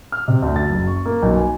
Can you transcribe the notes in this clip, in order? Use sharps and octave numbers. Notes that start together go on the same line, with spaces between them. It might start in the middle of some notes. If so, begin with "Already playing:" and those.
F6
C3
D2
A6
F#1
C#6
A#3
B1
G#5